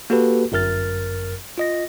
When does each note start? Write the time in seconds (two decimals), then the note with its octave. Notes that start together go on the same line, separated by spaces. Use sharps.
0.10 A#3 F#4 G4 A4 B4
0.52 G1 F#2 A#4 F6 A6
1.58 F4 D#5 A#6